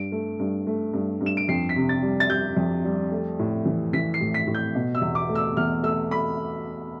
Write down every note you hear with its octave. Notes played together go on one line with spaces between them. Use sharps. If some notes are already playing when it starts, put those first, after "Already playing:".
Already playing: G2 D7
A3
G2
A3
G2
G2
E7
D7
F2 C7
B6
C3
A6
G3
A6
G3 G6
F2
G3
A3
A2
E3
E3 B6
C7
A2
B6
A2
G6
B2
E6
E2
D6
A3
E6
E2 F6
A3 E6
A3 B5